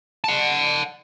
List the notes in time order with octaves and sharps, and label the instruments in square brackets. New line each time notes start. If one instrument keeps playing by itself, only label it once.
[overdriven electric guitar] F#5 A5